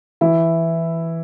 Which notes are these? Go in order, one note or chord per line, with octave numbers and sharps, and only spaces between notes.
E3 E4